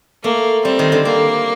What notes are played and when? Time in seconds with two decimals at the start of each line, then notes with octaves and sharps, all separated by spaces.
0.24 A3 A#3
0.65 G3 C4
0.79 D#3
0.92 D3
1.05 A#3 C4